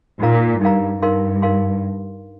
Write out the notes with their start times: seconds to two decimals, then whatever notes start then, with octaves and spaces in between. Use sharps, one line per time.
0.21 A#2 D#4 A#4 F5 A#5
0.61 G2 D#4 A#4 F5 A#5
1.01 G2 D#4 A#4 F5 C6
1.42 D#4 A#4 F5 C6